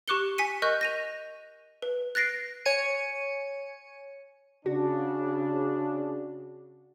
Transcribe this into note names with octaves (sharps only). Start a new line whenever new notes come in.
G4 C#6 D6 F#6 C#7 G7
G#5 B6 C#7 D#7
A#4 D#5 C#6 F#6 G6
A#6 D#7 F7
B4
F#6 A6 A#6 C7 D7
C#5 G#5 C#7 D#7
C#3 D4 F#4